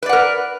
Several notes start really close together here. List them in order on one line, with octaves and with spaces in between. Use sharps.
B4 D5 F#5 A#4